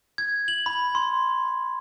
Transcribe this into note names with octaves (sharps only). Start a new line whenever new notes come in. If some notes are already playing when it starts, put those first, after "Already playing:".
G#6
F#7
B5
C6